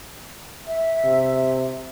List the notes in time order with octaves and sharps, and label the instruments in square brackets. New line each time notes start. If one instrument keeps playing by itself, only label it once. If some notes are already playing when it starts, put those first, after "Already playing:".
[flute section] E5
[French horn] C3